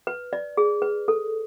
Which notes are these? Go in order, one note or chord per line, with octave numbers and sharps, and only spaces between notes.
B4
D5
G#4
B4
A4